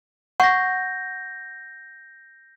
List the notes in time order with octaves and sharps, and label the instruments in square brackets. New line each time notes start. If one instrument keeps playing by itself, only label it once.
[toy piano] F#5 C#6 [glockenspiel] G6 A#6